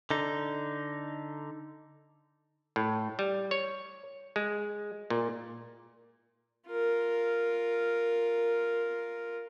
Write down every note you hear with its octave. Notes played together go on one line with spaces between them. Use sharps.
D3 D#4
A2
G3
C#5
G#3
A#2
F4 A#4